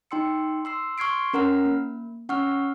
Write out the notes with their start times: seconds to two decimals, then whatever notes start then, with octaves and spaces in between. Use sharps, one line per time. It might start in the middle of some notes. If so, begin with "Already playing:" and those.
0.11 D#4 G5 C6 E6 C#7
0.65 C6 E6 C7
0.98 C6 C#6 F6 G#6 C7 D7
1.34 C#4 A#4 F#5 A#5 F6
1.66 A#3
2.29 C#4 F#5 C#6 E6 F6